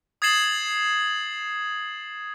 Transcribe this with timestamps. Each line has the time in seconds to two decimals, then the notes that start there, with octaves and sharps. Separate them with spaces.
0.22 D#6 G#6 A6 C7 E7 F#7